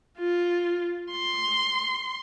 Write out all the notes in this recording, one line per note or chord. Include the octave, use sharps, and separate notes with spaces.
F4
C6